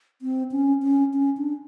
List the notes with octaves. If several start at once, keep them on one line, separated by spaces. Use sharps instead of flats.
C4
C#4
C#4
C#4
D4